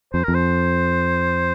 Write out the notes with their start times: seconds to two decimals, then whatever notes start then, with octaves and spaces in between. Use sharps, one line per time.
0.13 F2 C5
0.24 F2 A#4
0.34 C5